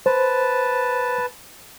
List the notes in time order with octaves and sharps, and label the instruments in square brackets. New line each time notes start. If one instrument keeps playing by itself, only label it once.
[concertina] B4 A5 [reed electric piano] C5